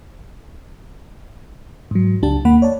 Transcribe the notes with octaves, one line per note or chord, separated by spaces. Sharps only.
G#2 F#3
C#2 D4 G4 A5
D#2 A#3 F#5 B5
C#5 D5 A5